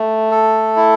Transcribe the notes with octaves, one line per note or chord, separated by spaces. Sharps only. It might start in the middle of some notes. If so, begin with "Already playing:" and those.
Already playing: A3
A4
E4